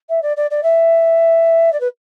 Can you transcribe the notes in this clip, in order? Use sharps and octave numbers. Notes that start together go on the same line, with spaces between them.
E5
D5
D5
D5
E5
D5
B4